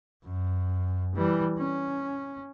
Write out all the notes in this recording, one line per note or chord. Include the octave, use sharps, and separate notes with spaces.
F#2
E3 G3
C#4